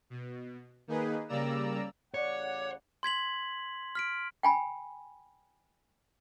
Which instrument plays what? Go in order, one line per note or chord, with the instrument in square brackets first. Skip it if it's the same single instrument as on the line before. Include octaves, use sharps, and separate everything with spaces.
[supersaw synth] B2
D#3 A#3 D#4 G#4 B4
C#3 G3 A#3 D5 A#5 E6
[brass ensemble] A1 C#3 F#5 [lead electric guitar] C#5 [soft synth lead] D5
[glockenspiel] C6 G#6 B6 F#7
F6 B6 D7
[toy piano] G5 G#5 B5